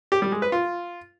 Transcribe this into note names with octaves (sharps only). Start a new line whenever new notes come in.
G4
G3
G#3
B4
F4